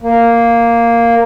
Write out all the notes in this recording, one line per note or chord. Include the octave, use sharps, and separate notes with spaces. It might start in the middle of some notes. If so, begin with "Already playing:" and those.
A#3